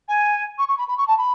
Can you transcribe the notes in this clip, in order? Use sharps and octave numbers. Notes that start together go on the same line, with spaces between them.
G#5
C#6
C#6
B5
B5
C#6
A5
B5